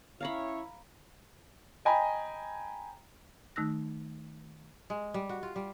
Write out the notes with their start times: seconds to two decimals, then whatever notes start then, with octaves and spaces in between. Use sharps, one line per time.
0.21 C#4 E4 C#5 F5 A#5 B5
1.85 D#5 G5 G#5 A#5 B5
3.56 D#3 A3 D#4 E6 F#6 A#6
4.90 G#3
5.14 G3
5.29 F#4
5.43 F4
5.56 G3